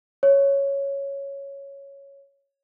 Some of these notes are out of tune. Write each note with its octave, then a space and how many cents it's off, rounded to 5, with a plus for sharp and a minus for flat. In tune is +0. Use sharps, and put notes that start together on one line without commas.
C#5 +0